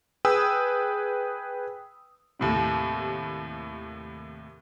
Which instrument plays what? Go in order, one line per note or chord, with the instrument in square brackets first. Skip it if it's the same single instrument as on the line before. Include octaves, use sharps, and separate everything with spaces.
[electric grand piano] G#4 B4 G5 G#5 D#6 E6
[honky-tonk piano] D#2 A2 C3